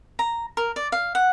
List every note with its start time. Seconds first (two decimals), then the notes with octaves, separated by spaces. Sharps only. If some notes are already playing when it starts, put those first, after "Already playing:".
0.19 A#5
0.57 A#4
0.76 D5
0.92 F5
1.15 F#5